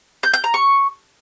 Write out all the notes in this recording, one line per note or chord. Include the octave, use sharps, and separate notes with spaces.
G6
G6
A#5
C#6